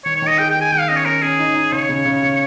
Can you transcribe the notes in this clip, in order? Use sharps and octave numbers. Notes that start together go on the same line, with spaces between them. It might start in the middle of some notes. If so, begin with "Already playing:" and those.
D#3 C#5
C#5
D#3 D#5
G#4 G5
G5
G#4
G#5
D#3 G5
F5
C#4 D#5
C#5
C#4 A#4
C#4 G#4
D#4
D#4
C#3 C#5
C#3
C#3
C#3